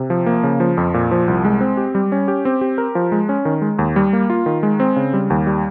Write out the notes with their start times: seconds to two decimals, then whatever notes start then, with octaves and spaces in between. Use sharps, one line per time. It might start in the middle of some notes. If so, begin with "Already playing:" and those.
Already playing: C3
0.10 F3
0.26 A#3
0.44 C#3
0.60 F3
0.77 F2
0.94 A#2
1.11 F3
1.28 C2
1.45 G#3
1.61 C4
1.77 G4
1.95 G3
2.12 C#4
2.28 G4
2.45 C4
2.61 G4
2.78 A#4
2.95 F3
3.12 G#3
3.29 C#4
3.45 D#3
3.62 G#3
3.79 D#2
3.96 G3
4.13 A#3
4.30 F4
4.46 D#3
4.63 G#3
4.80 C4
4.96 C#3
5.13 G3
5.30 D#2
5.47 G3